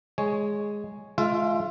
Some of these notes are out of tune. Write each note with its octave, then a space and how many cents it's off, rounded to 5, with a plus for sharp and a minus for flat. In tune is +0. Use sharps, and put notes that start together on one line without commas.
G#3 +0 C#5 +0
G#3 +40 F4 +0 E5 +25